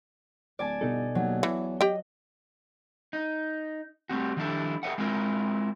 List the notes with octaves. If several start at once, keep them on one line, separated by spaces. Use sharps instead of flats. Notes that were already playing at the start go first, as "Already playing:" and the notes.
D1 D5 G#5 A5
G1 B2 D#4 A4
D#2 F#3
E2 E3
G4 D#5 G5
D#4
G3 A3 C4 F#4
D#3 F3 G3 D4 E4 A4
G#4 A#4 C5 D#5 E5 F#5
G#3 C4 E4 F4 A#4